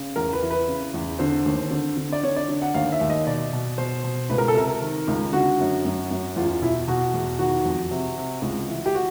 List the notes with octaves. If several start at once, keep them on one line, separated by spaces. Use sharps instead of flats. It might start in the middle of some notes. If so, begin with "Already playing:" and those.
Already playing: C#3
E2 A#4
B4
E3
B4
C#3
E2
D3 C5
D#2
D3
D3
D5
D3 C#5
D5
D3
F#5
D#2 F5
E5
D#2
D#5
B2 D5
B2
B2 C5
B2
C#2 B4
A#4
A4
C3 A#4
D#3
C#2
D3 F#4
F#2
F#2
F#2
E2 F4
F4
B2 E4
B2 F#4
E2
D#3 F#4
F2
C3
C3
C#2
E3
G4
F#4